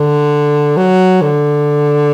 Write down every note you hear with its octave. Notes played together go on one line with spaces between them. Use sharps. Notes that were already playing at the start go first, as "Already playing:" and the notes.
Already playing: D3
F#3
D3